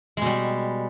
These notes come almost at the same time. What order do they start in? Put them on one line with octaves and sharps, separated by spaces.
G#3 B2 G3